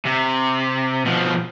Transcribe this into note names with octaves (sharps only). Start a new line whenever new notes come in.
C3
B2 F3